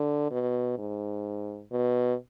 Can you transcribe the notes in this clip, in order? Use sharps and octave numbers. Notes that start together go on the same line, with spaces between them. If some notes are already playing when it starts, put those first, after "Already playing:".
Already playing: D3
B2
G#2
B2